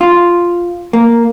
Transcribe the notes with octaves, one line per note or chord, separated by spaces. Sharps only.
F4
A#3